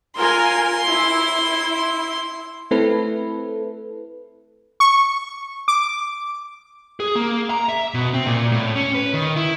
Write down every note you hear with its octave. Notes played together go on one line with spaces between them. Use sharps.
F4 A#4 G#5 C6
E4
A3 C4 E4 A4 B4
C#6
D6
G#4
A#3
A#5
E5
B2
C4
A#2
A2
C#4
B4
D#3
E4